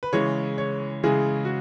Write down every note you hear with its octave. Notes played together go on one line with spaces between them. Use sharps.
B4
C#3 E3 G#3 C#5
C#5
C#3 E3 G#3 G#4
F#4